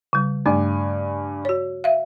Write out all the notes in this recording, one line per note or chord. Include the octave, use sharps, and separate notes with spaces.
C#3 G3
G2 A3 G#5 D6
F#4 C#5
E5 F5